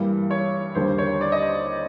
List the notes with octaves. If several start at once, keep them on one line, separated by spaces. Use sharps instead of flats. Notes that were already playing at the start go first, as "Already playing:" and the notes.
Already playing: G2 E3 G3 A#3
C#5
D#2 D3 G3 A#3 C5
C#5
D5
D#5